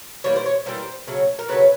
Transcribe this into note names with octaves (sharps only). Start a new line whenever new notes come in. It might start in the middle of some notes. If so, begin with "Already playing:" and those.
E3 G3 A#3 C#5
C5
C#5
E3 G3 A#3 C5
C#3 F#3 A3
A#4
C#3 F#3 A3 B4